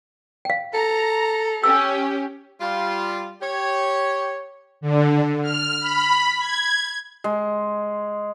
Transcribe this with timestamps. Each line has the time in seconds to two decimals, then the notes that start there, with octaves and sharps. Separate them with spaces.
0.45 F5 G5
0.74 A4 A#5
1.63 C#4 G4 E6
2.61 G3 F4
3.42 G4 C#5
4.81 D3
5.42 F6
5.80 B5
6.39 G#6
7.24 G#3